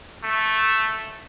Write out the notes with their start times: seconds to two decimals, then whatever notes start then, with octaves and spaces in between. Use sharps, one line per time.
0.23 A3